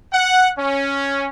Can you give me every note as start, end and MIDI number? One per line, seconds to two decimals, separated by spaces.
0.13 0.50 78
0.58 1.27 61